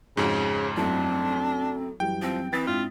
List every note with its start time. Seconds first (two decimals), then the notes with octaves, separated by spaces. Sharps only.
0.17 F2 G#2 C#3 F#4 A#5
0.77 F#2 A3 C4 D4 E4
2.00 F#2 E3 G3 G5
2.22 F3 C4
2.52 E3 C4 D#6 A6 B6
2.67 G#2 D4 E4 F4